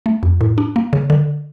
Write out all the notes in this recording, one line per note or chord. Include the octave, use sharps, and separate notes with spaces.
A3
F2
A2
D4
A#3
C#3
D3